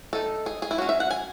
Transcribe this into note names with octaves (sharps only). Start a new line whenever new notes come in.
D#3 A3 D#4 A4
G#4
G#4
E4
F#3 C#4 F#4
E5
F#5
G#5